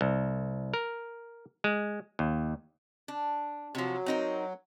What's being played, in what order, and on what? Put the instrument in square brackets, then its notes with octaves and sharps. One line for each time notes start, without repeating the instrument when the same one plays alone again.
[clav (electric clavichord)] C2
A#4
G#3
D#2
[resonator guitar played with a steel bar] D4
[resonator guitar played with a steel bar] C3 F3 [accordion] F#3
[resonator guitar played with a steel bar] C4 D#4 A#4